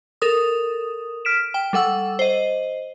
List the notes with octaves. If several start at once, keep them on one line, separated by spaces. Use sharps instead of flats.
A4 A#4 D#6
F6 B6 D7 E7
G5
G3 A4 F#5 E6
C5 D#5